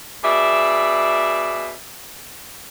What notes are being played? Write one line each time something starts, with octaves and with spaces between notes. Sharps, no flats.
B2 G#4 D5 E5